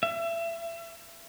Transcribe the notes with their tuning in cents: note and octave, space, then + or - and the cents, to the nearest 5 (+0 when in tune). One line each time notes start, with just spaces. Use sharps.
E5 +30